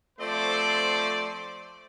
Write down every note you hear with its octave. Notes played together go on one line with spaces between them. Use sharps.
F3 A3 C4 C5 D5